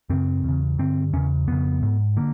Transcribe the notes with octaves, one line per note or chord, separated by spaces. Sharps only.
F#2 C#3 C4
E2 C#3
G2 D3 C4
E2 C#3 C#4
F2 C#3 B3
G#2
D3 A#3